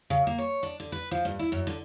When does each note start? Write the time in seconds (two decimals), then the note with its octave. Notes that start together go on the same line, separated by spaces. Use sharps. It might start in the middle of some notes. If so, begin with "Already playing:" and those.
0.10 C#3
0.27 A#3
0.38 C#5
0.63 D4
0.80 D3
0.92 B4
1.11 F3
1.25 G2
1.39 E4
1.52 F#2
1.67 D3